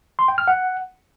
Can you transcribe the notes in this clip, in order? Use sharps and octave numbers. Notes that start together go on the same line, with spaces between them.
C6
G5
F6
F#5